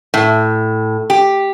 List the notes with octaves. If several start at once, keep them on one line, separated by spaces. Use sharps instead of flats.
A2
G4